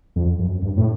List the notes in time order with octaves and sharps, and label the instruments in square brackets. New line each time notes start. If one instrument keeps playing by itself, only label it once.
[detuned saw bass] F2
F#2
G2
A2